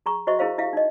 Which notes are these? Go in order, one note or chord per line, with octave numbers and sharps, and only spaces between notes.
G#4 A#5 C#6
F#4 C5 D#5 E5 C#6
E4 G#4 A#4 C5 F5
E4 G4 E5 F5
D#4 D#5